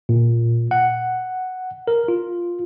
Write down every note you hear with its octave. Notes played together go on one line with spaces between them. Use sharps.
A#2
F#5
A#4
F4